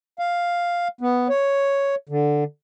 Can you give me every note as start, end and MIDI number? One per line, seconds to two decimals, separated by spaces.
0.19 0.88 77
1.01 1.28 59
1.29 1.95 73
2.09 2.44 50